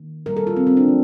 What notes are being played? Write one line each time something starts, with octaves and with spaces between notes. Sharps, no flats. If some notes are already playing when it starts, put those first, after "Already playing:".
Already playing: D#3 A#3
A#2 G3 A#3 A#4
A4
F4
C4
C4
D4
C#3 F#3 A3